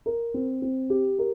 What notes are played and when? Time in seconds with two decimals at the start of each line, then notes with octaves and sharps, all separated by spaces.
0.06 A#4
0.34 C4
0.62 C4
0.90 G4
1.19 A#4